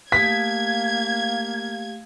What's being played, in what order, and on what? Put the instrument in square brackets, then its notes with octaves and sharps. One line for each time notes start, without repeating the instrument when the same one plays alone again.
[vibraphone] A3 G4 F5 [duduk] A#3 [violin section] G#6 [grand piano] B6